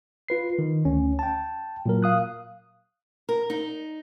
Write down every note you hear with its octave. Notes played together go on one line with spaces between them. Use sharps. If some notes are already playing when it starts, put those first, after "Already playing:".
F4 B4 C7
D#3
D2 C#4
G5 A5
A#2 F#3 A#4
F5 D#6 F#6
A#4
D#4